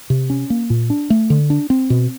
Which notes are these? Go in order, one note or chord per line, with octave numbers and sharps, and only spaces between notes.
C3
C#4
A#3
A#2
D4
A3
D3
D4
C4
B2